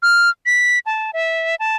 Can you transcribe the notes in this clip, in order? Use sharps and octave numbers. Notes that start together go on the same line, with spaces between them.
F6
B6
A5
E5
A5